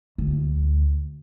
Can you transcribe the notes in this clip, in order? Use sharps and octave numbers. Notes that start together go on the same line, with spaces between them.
D2